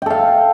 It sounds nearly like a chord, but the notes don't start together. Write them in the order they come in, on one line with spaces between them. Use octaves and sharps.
G5 A4 F5